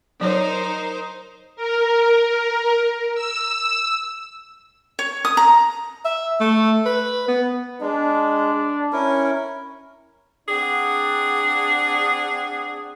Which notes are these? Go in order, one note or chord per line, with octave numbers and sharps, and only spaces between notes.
F#3 D#4 A#4 C5 C#5
A#4
E6
C#5
D#6
A#5
E5
A3
B4
B3
G#3 D4
C#4 E4 A#4
C4 D4 G#4 D5 F#5